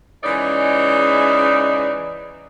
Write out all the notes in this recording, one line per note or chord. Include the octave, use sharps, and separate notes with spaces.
C#3 E3 G#3 D#4 C#5 D5